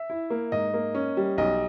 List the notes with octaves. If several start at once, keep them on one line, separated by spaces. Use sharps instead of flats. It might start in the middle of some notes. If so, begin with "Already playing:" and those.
Already playing: E5
E4
A#3
G#2 D#5
A#3
C#4
G3
B1 D#5